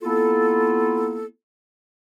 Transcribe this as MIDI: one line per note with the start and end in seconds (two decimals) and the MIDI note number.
0.03 1.27 58
0.03 1.27 59
0.03 1.27 64
0.03 1.27 65
0.03 1.27 69